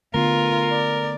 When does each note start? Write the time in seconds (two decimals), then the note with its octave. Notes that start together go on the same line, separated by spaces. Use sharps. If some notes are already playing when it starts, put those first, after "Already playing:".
0.14 D3 A3 B3 F4 A#4
0.70 D5